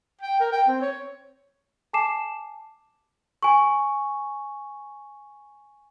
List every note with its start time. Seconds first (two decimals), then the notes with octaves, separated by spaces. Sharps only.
0.21 G5
0.40 A#4
0.52 G5
0.68 C4
0.81 C#5
1.93 G#5 A5 D6 C7 E7
3.43 G#5 C#6